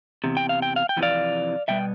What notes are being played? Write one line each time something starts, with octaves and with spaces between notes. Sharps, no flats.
E2 C3
G5
F5
G5
F5
G5
F2 C3 E3 B3
D5 F5
B2 G3 B3 E5 G5